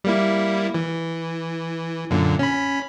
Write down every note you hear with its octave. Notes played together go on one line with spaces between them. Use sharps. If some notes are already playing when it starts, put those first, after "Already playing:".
G3 A#3 E4
E3
F#2 A#2 D3
C#4 B5